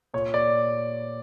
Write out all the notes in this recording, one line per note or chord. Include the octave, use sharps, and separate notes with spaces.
A#2 C#5
D5